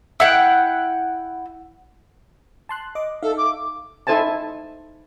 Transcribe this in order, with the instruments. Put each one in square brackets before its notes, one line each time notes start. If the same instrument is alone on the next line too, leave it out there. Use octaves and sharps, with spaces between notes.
[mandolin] E4 F#5 G5
[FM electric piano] A5 C6 F#6
D#5 D6
[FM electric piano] D#4 E5 F5 [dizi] A4
[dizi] D6
[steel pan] D#4 E4 A4 C5 G#5 A5